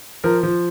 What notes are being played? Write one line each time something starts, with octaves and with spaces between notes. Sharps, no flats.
F3 A#4
F3